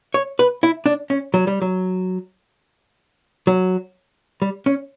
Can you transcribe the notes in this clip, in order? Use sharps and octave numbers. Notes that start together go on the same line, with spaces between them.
C#5
B4
E4
D4
C#4
F#3
G3
F#3
F#3
G3
C#4